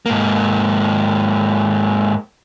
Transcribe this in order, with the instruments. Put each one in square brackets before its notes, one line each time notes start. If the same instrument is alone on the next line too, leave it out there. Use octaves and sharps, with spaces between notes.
[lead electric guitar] G#2 A#3